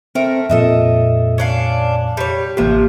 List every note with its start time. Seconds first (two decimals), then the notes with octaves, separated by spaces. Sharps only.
0.15 A3 C4 A#4
0.50 F2 A#2 A4 D#5 E5
1.38 C#4 D4 F5
2.17 G3 C#5
2.57 A1 C3 F3 A#3 G4